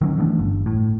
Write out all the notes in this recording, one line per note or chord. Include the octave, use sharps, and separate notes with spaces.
D#3 F#3 C#4
E3 A3 B3 D4
G1
A2